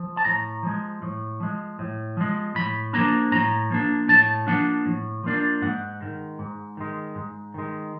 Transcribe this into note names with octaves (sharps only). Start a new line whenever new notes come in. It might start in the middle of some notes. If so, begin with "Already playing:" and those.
Already playing: F3
A5
A2 A#5
F3 G#3
A2
F3 G#3
A2
F3 G#3
A2 B5
F3 A#3 D4 A#5
A2 A#5
F3 A#3 D4
A2 A5
F3 A#3 D4 F#5
A2
F3 A#3 D4
G#2 F#5
D#3 G#3
G#2
D#3 G#3
G#2
D#3 G#3